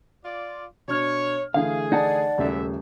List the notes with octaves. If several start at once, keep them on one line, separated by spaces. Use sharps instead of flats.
F4 D5
B2 D4 C#5 F6
D3 E3 A3 G#4 F5
D#4 D5 F#5 A5
D#1 F#2 C#3 E3 A3 E5